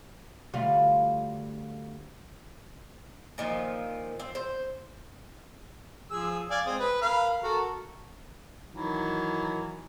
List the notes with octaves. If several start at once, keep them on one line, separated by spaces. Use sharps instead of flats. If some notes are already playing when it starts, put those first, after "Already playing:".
D2 G3 F4
A#2 D#3 F3
C4
C5
F3 G#4 E6
D5 F5 G#5
G#3 C4 D#6
B4
A#4 F5 B5
F#4 A4 A#4
D#3 E3 F#3